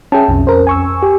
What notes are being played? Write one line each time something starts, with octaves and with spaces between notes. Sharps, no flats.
C#4 G#4 E5 G5 A5
B1 F2 C#4
A#4 C5
G#5 C#6 E6
G4